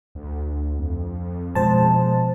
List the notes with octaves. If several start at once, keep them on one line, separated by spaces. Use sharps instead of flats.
D2
F2
B2 F3 G#3 C5 A5